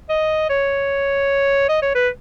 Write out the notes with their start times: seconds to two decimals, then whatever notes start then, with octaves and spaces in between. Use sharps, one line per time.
0.09 D#5
0.49 C#5
1.69 D#5
1.82 C#5
1.95 B4